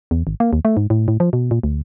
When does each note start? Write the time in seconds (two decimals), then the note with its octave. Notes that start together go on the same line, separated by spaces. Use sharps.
0.11 E2
0.27 G#1
0.40 A#3
0.53 D#2
0.65 A3
0.77 G#2
0.90 A2
1.08 A2
1.20 F3
1.33 B2
1.51 A#2
1.63 D2